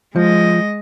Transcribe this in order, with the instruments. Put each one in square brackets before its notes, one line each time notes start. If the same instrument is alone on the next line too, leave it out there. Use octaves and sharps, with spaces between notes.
[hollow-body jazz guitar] F3 [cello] G#3 D#5